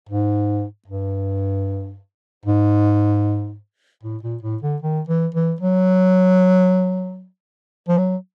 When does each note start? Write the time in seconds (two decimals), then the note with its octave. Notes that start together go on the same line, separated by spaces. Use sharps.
0.09 G#2
0.88 G2
2.46 G#2
4.03 A2
4.23 A#2
4.43 A2
4.63 D3
4.82 D#3
5.09 E3
5.35 E3
5.61 F#3
7.88 F3
7.98 F#3